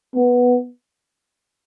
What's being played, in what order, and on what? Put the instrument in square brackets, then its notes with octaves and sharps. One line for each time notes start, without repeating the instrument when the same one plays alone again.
[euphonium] B3